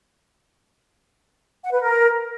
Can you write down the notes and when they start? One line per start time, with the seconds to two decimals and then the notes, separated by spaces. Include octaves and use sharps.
1.63 F#5
1.72 B4
1.81 A#4